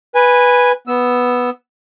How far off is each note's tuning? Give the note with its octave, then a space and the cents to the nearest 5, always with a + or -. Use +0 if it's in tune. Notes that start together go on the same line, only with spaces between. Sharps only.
B4 -5 G#5 -10
B3 +0 E6 -5